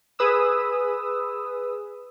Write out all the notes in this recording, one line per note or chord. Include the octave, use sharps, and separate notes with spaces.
G#4 B4 D#6 E6